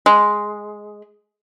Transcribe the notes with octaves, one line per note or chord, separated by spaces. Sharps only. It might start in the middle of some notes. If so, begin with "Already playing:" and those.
G#3